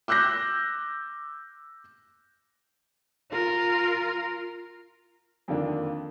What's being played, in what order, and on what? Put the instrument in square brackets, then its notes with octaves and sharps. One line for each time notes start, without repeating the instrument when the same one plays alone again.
[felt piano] D6 E6 F#6 G6 A#6
[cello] F4 A#4
[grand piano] F2 D3 D#3 A#3 D4